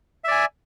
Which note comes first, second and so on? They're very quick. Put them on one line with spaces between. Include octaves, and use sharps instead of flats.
E5 D5 G#5